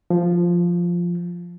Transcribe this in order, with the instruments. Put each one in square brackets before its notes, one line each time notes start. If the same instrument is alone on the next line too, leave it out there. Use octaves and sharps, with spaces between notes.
[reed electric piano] F3